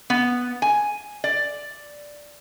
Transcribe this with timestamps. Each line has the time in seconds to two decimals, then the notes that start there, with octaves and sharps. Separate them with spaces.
0.10 B3
0.62 G#5
1.24 D5